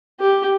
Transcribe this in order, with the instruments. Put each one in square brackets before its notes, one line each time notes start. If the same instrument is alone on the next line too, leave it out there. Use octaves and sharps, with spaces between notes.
[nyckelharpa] G4